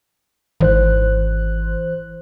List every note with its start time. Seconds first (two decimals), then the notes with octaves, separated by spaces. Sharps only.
0.60 G#1 E3 C5 F#6